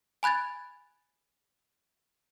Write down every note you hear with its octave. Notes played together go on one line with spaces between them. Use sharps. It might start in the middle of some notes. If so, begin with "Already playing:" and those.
G#5 B5 F#6 G#6 A6